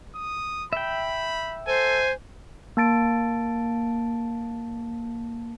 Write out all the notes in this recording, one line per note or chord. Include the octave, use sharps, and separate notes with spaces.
D#6
E5 G5 B5
A4 C5 G#5
A#3 A5 A6 D7